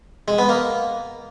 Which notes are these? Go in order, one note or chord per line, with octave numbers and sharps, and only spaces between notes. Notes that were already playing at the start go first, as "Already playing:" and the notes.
G#3
B3
A#3